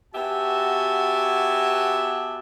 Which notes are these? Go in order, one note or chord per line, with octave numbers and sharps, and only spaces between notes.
B3 F#4 G4 E5 G#5 A5